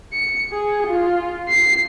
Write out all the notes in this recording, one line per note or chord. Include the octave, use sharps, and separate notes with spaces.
C#7
G#4
F4
C7